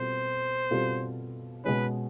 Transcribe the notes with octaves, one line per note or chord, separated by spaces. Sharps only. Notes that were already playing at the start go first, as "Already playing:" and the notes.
Already playing: B2 G3 C4 F4 A4 C5
B2 G3 C4 F4 A4
B2 G#3 C#4 B4